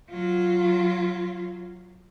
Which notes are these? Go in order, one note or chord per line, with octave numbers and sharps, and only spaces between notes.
F#3 F4